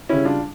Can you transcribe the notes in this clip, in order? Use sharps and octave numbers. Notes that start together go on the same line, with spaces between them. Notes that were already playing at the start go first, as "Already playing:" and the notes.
C#3 G3 C#4 E4
D4 F4